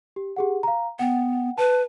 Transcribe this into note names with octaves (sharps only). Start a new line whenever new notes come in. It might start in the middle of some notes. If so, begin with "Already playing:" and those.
G4
G4 G#4 F#5
F5 A#5
B3 F#5 G5
B4 A5